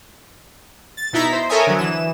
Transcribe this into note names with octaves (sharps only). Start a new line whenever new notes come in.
A6
B2 D#4 E4 A#5 B6
C5
A4 A#4 C#5 E5 G#5 D#6
D3 F#3
E3 E7